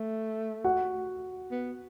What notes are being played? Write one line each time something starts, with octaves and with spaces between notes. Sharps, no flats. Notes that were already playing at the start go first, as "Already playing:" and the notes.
Already playing: A3
F#4 F#5
B3